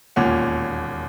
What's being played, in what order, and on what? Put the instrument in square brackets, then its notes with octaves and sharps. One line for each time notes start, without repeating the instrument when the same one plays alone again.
[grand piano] E1 D#2 A#2 C#4 F#5